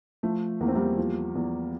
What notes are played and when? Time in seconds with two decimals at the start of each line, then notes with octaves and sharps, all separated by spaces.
0.23 F3 A3
0.61 E2 A#3
0.68 C4
0.75 G3 A#3
0.98 F3
1.35 E2